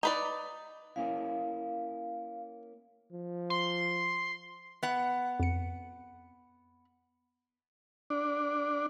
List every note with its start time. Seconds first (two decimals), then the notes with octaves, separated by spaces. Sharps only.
0.03 D#4 B4 D5 A#5
0.96 A#3 C#4 E4 F5
3.11 F3
3.50 C6
4.83 B3 F#5
5.40 F2 C#7
8.10 D4